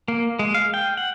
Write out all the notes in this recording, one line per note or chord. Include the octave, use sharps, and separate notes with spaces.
A#3
G#3
F5
G5
F#5